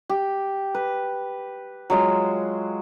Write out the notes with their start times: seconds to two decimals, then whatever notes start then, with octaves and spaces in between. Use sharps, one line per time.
0.09 G4
0.74 B4
1.90 F#3 G#3 F4